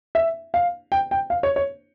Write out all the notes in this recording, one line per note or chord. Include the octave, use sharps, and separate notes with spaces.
E5
F5
G5
G5
F5
C#5
C#5